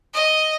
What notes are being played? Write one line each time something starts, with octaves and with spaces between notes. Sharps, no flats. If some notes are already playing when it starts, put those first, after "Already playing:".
D#5